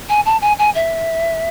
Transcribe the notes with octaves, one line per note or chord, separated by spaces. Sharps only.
G#5
A5
G#5
G#5
E5